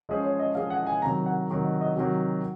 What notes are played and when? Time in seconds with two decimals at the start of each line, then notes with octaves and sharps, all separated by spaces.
0.09 F3 G#3 C#4 G#4 C5 D#5
0.25 C#5
0.40 D#5
0.55 F3 G#3 C#4 G#4 C5 F5
0.70 F#5
0.87 G#5
1.02 C3 D#3 F#3 A#5
1.26 F#5
1.50 C3 D#3 F#3
1.64 D#5
1.81 D#5
1.96 C3 D#3 F#3 F#4